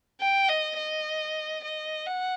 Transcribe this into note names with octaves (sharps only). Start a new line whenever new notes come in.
G5
D#5
D#5
D#5
F#5